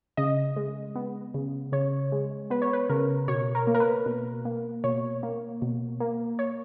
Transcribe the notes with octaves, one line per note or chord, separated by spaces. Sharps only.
C#3 D#5
G#3
B3
C#3
C#3 C#5
G#3
B3 B4
C#5
B4
C#3 A#4
B2 C#5
A#4
A#3
A#4
B4
B2
A#3
B2 C#5
A#3
B2
A#3
C#5